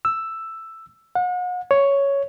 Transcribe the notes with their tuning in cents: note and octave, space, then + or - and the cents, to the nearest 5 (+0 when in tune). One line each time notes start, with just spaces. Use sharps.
E6 +5
F#5 -40
C#5 +5